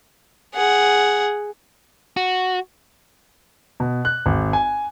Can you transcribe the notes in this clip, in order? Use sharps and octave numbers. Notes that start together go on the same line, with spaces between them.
G#4 F#5
F#4
B2
F#6
G#1
G#5